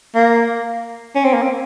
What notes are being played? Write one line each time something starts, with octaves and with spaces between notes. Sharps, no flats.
A#3
C#4
C4
A#3
C4